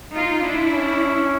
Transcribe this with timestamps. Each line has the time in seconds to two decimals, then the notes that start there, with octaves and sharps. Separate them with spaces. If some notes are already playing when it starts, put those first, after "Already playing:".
0.16 D#4 F4
0.44 D4 E4
0.73 C#4